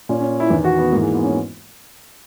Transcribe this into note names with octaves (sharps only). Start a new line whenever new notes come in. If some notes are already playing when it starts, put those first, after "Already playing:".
A#2 C#4
C#4
E4
E2 D#3
F#4
B3
G#2 E3 A#3
G#3
B3
C#4